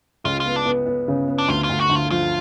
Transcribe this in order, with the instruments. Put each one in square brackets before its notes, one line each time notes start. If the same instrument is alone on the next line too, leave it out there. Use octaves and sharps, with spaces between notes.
[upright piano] C#2 [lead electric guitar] F4
[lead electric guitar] F4
[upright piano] B3
[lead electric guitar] D4
[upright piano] B3
B3
C#3
B3
[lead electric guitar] D4
[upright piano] D2 [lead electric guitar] F4
[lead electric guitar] F4
[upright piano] D2
[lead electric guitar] F#4
[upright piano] D2
[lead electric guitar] F4
[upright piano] F3 [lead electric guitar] F4